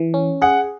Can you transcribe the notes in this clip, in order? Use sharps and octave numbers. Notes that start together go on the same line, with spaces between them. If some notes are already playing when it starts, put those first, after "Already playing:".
Already playing: E3
C#4
G#4 F#5